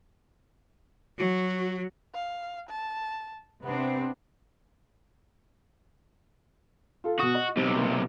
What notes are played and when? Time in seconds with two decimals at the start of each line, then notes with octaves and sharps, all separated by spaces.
1.18 F#3 F#4
2.15 F5
2.70 A5
3.64 C3 B3 C4 D4
7.04 F4 A4
7.20 B2 F#4 D#6
7.35 D#5
7.57 B1 C3
7.76 A#3